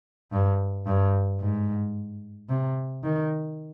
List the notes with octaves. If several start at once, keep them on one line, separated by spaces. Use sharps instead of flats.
G2
G2
G#2
C3
D#3